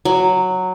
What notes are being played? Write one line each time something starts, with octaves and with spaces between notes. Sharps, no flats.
F#3